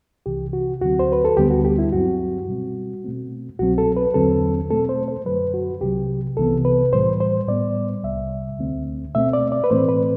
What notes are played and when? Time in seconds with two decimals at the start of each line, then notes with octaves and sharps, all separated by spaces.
0.26 C2 C3 E3 G4
0.53 F#4
0.82 D2 D3 F#3 C4 F#4
0.99 C5
1.12 B4
1.25 A4
1.37 D2 D3 G3 B3 G4
1.50 F#4
1.65 G4
1.78 E4
1.93 G2 F#3 C4 F#4
2.48 B2 G3 C4
3.04 B2 A3 C4
3.59 C2 B2 F#3 C4 F#4
3.78 A4
3.97 B4
4.14 E2 D3 F#3 C4 A4
4.71 B2 A3 C4 A4
4.89 C5
5.08 C5
5.26 F#2 D3 F#3 B4
5.54 F#4
5.81 C2 C3 F#3 G4
6.37 C2 C3 E3 B3 A4
6.65 B4
6.93 A2 E3 G3 C5
7.20 C5
7.48 A2 G3 B3 D5
8.03 C2 C3 G3 E5
8.59 D2 D3 A3 C4
9.15 B2 A3 C4 E5
9.33 D5
9.52 D5
9.64 B4
9.70 A2 E3 A3 C4 C5
9.89 B4